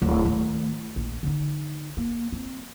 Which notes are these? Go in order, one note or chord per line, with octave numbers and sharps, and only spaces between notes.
D1
D#3 A3
A#1
D3 D#4
A#3
C4